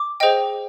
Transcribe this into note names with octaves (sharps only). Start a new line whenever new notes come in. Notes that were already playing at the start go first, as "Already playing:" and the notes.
Already playing: D6
G#4 C5 D#5 G5